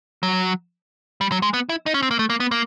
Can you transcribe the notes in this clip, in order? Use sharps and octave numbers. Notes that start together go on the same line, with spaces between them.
F#3
G3
F#3
G#3
B3
E4
D#4
C#4
C4
A#3
A3
A#3
B3
A#3